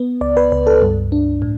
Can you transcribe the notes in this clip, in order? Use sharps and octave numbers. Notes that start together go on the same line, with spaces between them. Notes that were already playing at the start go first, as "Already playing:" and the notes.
Already playing: B3
C#2 D5
B4
C#2 B4
A4
G2
D4
A2